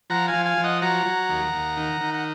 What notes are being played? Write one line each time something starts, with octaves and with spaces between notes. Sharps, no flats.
F3 F#5 A#5
F5 G#5
F3
F5 G#5
F3
D#5 F#5
F#3 F#5 A#5
F#3
D#2
D#2
D#3
D#3
F#5